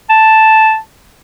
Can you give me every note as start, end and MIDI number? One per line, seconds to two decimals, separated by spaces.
0.09 0.78 81